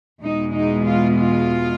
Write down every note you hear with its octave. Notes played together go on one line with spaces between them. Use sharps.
E2 B2 G#3 D#4
D#4
F4
F4